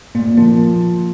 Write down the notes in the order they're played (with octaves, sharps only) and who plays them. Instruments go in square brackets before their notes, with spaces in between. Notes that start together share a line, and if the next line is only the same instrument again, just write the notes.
[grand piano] A#2 [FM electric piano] A#3
[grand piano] F3 [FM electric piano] A#3